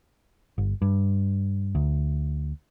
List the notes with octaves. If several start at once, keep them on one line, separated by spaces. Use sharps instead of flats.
G1
G2
D2